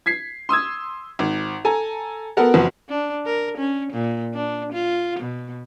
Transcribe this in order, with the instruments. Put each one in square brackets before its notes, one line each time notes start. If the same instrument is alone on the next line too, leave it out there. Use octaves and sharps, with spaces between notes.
[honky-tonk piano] G#6 B6 C7
C6 D#6 E6 G#6
G#1
A4 G#5 A#5
B3 F#4 A4 A#4 F#5
F#1 F2 F3 F#4 B4
[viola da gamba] D4
A#4
C#4
A#2
D4
F4
B2